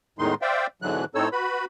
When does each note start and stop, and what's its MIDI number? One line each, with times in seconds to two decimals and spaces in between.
0.19 0.34 40
0.19 0.34 45
0.19 0.34 51
0.19 0.34 56
0.19 0.34 63
0.19 0.34 84
0.42 0.67 72
0.42 0.67 74
0.42 0.67 76
0.42 0.67 77
0.42 0.67 79
0.82 1.05 44
0.82 1.05 47
0.82 1.05 50
0.82 1.05 52
0.82 1.05 54
0.82 1.05 90
1.15 1.29 45
1.15 1.29 60
1.15 1.29 63
1.15 1.29 69
1.15 1.29 73
1.15 1.29 88
1.32 1.65 66
1.32 1.65 71
1.32 1.65 83